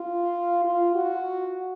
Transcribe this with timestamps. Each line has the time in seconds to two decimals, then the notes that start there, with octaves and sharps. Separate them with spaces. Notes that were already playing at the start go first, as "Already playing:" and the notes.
Already playing: F4
0.65 F4
0.95 F#4